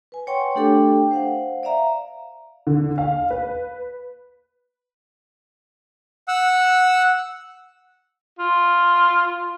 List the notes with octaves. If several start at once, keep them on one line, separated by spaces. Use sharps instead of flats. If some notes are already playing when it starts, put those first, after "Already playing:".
B4 G#5
C#5 F#5 G5 C6 C#6
A3 D4 G4 A4 G5 D6
C5 F5 F#5
D5 E5 F5 A#5
D3
F5
B4
F#5 E6
F4